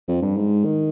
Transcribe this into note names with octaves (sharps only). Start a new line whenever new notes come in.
F2
G2
G#2
D#3